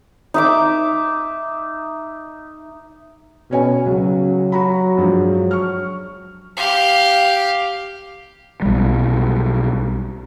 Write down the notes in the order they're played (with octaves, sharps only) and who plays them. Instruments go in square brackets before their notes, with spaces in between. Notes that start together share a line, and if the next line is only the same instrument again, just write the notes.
[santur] D#4 E5 D6
[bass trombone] B2 [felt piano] C#4 C#5 G#5
[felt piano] C#2 [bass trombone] F#3
[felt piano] F#4 A#5 B5
G2 F3 G#3
C#6 F6
[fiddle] G4 F5
[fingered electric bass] B1 G3